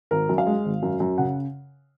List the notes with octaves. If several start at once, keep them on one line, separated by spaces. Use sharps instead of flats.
G#1 A#4
F#2
F5
G#3
G#1
F#2
F#2
C#3 F#5